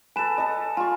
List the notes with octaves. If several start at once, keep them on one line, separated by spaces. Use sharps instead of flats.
A4 B4 G#5 E7
A4 D#5
F4 G#5 C#6